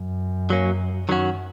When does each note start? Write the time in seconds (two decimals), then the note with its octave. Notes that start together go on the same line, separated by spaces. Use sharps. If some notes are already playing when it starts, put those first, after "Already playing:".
Already playing: F#2
0.50 F#3 A#3 C#4
1.08 F#2 D#3 F#3 C#4 F#4